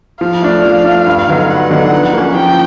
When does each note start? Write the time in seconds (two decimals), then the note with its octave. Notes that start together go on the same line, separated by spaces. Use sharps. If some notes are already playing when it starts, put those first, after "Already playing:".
0.21 F3 F5
0.42 A3 D4
0.64 F3
0.85 A3 D4
1.07 G2
1.28 D3 F#3 B3 D#4
1.50 G2 F#5
1.70 D3 F#3 B3 D#4
1.92 F3
2.13 A#3 C#4
2.35 F3 G5